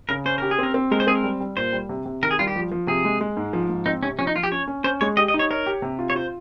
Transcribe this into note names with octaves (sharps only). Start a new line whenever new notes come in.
C#3 A#4
C#4 C5
G4 A#4
G#4
C4 A#4
C4
G#3 A#4
C5
C4 G#4
A#4
G3
G3
A#2 C5
G3
C3
C3
D#3 A#4
G#4
G3 F4
G4
F3
F3
C3 G#4
G#3
G#3
G#2
F3
G#2
C4 D#4
C3 C#4
F3 C#4
D#4
F3 F4
G4
C#4 C#5
C#4
C#4 C5
G#3 C#5
G4 D#5
D#5
D#4
C#5
A#4 C#5
G4
C3
F4
C#5
F4 C5